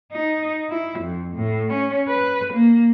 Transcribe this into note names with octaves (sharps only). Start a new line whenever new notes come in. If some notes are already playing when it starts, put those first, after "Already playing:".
D#4
E4
F2
A2
C#4
B4
A#3